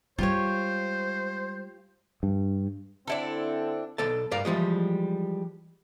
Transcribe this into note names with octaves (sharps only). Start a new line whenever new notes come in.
G3 G#3 F4 G4 C5 C#5
G2
D3 C4 D4 E4 A4
B1 A4 D5 A5
G2 A#4 D5 F5
E3 F3 G3 G#3